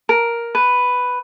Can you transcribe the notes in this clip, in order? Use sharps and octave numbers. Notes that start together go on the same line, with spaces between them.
A#4
B4